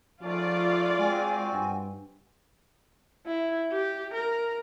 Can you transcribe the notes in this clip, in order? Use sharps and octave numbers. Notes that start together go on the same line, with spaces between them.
G#2 F3 A3 C#4 F4 D5
G#3 C4 F#4 G#5
G2
E4
G4
A#4